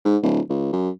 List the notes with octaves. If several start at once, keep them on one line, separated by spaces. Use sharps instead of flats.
G#2
D1
C#2
F#2